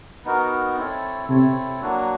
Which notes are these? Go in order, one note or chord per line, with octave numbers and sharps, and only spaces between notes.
B3 D#4 F#4 A#4
C4 E4 A4 C#5
C3 C4 E4 A4 C#5
F#3 A#3 D4 F#4